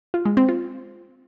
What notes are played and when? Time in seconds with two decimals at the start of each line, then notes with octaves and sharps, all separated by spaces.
0.14 F4
0.25 G#3
0.37 C4
0.49 F4